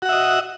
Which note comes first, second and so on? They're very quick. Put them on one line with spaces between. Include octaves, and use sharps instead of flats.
F#4 F#5 E5 D#5